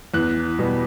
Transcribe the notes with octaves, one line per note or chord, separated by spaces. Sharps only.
E2 F#6
B2 G3 B3